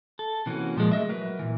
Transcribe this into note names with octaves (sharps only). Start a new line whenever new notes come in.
A4
C3 E3 A#3 C4 C#4 F#4
A#2 F3 F#3 G#3 A#3
A3 D#5 E5
F#3 A#4 B4 E5
A#2 E3